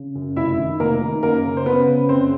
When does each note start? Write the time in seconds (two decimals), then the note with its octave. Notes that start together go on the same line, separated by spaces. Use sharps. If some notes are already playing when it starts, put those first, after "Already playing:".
Already playing: C#3
0.15 F#2
0.36 F1 E4 E5
0.58 D#3
0.80 F1 A#3 A#4
1.01 D#3
1.23 F#2 A#3 A#4
1.44 C#3
1.57 C5
1.66 C#3 B3 B4
1.88 C#3
2.09 F#1 C4 C5